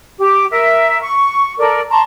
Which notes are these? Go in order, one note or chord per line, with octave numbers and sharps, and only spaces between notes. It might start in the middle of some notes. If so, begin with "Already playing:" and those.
G4 D6
A#4 E5
C#6
A4 A#4 D5
A5 A#5 C6 C#6